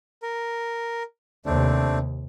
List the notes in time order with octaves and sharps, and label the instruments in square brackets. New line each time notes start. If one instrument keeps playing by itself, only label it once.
[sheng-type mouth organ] A#4
[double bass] D#2 C3 [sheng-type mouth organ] A3 C4 D4